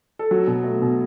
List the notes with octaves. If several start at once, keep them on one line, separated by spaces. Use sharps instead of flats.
A4
F#3 F#4
B2
A3
B2